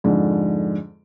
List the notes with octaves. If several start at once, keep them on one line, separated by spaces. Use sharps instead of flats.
F2 G#2 D3